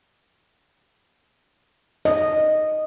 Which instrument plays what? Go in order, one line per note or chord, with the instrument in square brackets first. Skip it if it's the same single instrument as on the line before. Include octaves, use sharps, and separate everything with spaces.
[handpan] D#5